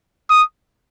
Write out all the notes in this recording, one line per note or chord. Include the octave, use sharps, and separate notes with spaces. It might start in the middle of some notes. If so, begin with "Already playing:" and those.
D#6